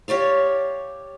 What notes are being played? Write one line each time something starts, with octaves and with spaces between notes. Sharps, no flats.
G4 C#5 D5 F5